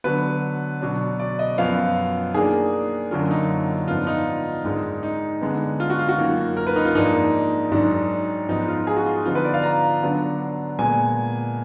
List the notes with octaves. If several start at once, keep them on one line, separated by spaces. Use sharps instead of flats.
D3 F#3 B3 B4
B2 F#3 D4
D5
D#5
F#2 F3 B3 F5
D#3 A#3 D4 G#4
F#2 D3 F#3 A#3 F4
D#4
G#2 F3 B3 D4 F4
D#4
G#2 D#3 G#3 D4
D#4
D3 G#3 B3
F4
F#4
F4
F#4
F#2 D#3 A#3
A#4
B4
D#4
F4
G#2 F3 A#3 D4 D#4
G#2 D#3 F#3 D4
G#2 F3 B3 D#4
F4
G#4
F#4
F4
D3 F3 B3 D#4 F4
B4
D5
F5
A#5
D3 F#3 B3 D4
A#2 G#3 B3 G#5